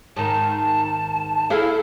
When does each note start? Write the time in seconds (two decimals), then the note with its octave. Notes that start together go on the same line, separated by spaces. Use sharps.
0.17 G#2 D#3 A5
1.50 E4 G#4 A4 F5